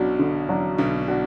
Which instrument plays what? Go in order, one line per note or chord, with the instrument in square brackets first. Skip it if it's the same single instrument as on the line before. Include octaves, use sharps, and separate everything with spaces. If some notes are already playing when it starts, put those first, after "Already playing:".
Already playing: [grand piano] B1 B2 [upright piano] F#3 D4 F#4
[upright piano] D3
F#3 D4 F#4
[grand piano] B1 B2 [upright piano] D3
[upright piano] D4 F#4